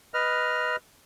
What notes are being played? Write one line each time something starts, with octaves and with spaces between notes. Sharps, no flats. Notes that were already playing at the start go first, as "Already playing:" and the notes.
B4 D#5 F6